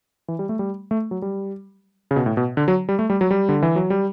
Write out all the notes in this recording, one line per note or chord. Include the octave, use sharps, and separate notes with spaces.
E3
G3
A3
G3
A3
F#3
G3
C#3
B2
A2
B2
D3
F#3
G3
A3
G3
F#3
G3
D3
E3
F#3
G3